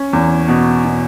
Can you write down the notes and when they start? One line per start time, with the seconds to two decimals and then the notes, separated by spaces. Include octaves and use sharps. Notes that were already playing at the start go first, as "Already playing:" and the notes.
Already playing: C#4
0.13 E2
0.48 B2
0.85 B2